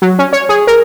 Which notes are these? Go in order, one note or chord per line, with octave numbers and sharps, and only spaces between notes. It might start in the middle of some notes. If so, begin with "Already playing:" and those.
F#3
C#4
C#5
G#4
A#4